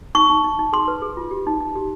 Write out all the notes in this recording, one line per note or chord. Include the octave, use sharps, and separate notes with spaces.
D#4 C#6
D#4
D#4
D#4
G#4 C6
B4
G#4
F4
G4
D#4
D#4
G4